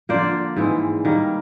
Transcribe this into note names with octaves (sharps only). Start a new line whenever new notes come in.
D3 F3 A#3 C5 D5
G#2 E3 G#3 C4
D#3 G3 A#3